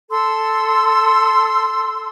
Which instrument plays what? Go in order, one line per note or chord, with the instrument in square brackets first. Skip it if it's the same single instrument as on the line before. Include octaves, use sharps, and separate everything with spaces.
[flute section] A4 C6 E6